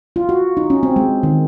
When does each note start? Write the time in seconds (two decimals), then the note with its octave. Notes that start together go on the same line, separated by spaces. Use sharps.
0.16 F4
0.29 F#4
0.57 D#4
0.70 C#4
0.83 C4
0.96 G#3
1.23 D#3